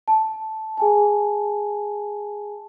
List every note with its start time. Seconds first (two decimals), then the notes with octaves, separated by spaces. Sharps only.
0.08 A5
0.77 G#4 G#5 A5